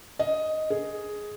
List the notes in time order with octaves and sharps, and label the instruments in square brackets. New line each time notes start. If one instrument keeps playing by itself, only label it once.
[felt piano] D#5
G#4